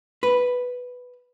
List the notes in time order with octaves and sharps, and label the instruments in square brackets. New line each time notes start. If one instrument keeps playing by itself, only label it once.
[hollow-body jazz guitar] B4